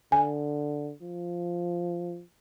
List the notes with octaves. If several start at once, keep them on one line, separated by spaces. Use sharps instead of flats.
D3 G#5
F3